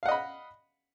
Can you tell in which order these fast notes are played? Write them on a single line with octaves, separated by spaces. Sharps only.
F5 F#5 D#5 B5